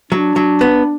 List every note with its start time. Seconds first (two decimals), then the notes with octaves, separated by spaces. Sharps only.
0.11 F#3 D4
0.36 F#3
0.61 B3